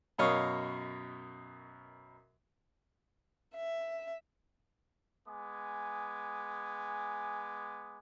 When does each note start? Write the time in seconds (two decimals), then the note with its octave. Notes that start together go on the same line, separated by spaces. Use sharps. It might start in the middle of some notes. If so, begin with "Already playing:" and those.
0.18 F#2 B2 A#4 C#5 D#5 F5
3.55 E5
5.28 G#3 B3 G#5 D6